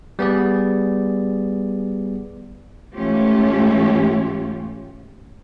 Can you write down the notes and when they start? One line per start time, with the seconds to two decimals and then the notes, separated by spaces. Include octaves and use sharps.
0.19 G3 B3 G#4 D5
2.95 G#2 E3 A3 C#4 F4 G4